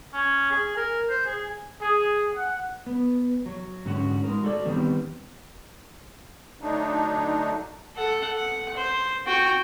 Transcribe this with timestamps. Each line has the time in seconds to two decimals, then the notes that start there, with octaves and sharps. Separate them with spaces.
0.13 C#4
0.51 G#4
0.76 A#4
1.09 C5
1.26 G#4
1.81 G#4
2.35 F#5
2.86 B3
3.46 F#3
3.85 G#2 D3 C#4 F#4
4.24 G#3 D#4 A#4
4.43 F#4 A4 D5
4.65 D#3 G3 B3 C4
6.61 D3 F#3 A3 D4 D#4
7.96 A4 F#5
8.36 F#5
8.76 C5
9.27 F#4 G5